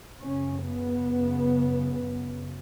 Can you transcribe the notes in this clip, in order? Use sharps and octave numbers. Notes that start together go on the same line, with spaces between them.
F#2 C#3 C#4
B3
F#2 C#3
F#2 C#3